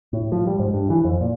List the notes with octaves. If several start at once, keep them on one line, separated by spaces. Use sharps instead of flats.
A2
F3
G3
G#2
G2
E3
F2
A#2